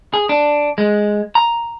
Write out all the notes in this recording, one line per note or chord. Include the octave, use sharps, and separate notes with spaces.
G#4
D4
G#3
A#5